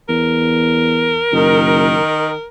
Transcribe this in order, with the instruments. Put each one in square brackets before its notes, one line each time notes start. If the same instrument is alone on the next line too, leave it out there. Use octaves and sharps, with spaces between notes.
[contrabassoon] E2 [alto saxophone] A#4
[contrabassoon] F#1 [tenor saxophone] D#3